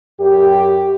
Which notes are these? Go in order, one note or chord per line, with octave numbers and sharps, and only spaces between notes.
F#2 G4